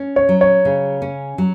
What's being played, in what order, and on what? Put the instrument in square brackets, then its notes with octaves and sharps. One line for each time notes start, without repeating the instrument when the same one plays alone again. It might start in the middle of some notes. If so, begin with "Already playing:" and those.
Already playing: [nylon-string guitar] C#4
[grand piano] C#5
[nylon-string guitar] F#3
[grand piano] C#5
[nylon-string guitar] C#3
C#4
F#3